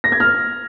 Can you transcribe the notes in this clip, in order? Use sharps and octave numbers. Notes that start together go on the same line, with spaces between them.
A#6
G#6
F6